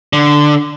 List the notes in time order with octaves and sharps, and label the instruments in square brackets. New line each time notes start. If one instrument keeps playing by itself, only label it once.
[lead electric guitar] D3